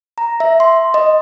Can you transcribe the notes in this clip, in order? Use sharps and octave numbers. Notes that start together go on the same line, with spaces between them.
A#5
E5
C6
D#5